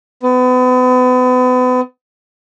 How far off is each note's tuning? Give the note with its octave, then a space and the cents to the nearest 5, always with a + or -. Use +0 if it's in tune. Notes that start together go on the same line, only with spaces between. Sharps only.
B3 +35